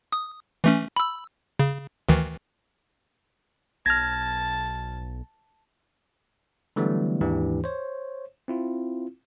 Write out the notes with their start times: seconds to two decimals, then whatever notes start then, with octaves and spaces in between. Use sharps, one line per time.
0.12 D#6
0.64 E3 A3 C#4
0.96 B5 E6
1.59 C#3
2.09 D2 D#3 E3
3.86 B1 A5 F6 G#6 A#6
6.76 D3 E3 F#3 G3 A3 B3
7.21 D#2 G#2 E3 D4 G4
7.64 C5 C#5
8.48 C4 E4 F4